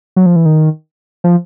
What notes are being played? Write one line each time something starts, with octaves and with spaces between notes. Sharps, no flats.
F#3
F3
E3
D#3
F3